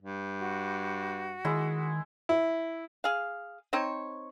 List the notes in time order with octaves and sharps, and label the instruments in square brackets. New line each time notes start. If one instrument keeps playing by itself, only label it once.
[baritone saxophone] G2
[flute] F#4
[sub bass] D#3 [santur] G#3 E4
[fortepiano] E4
[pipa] G#4 F5
C4 D#4 C5 C#5